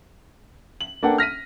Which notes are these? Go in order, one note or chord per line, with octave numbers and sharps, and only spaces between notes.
F#7
A#3 D4 A4 B4 F#5 G5
F6 A#6 B6 D#7